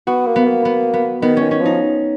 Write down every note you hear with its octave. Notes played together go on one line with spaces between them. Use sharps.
B3 F#4
A#3
B3
A#3
B3
B3
D#3 B3
D#3 C#4
C#4
F3
D#4